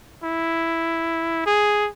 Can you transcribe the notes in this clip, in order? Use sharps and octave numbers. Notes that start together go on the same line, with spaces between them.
E4
G#4